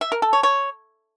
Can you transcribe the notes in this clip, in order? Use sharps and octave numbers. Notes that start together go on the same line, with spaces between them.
E5
A#4
A4
C#5
C#5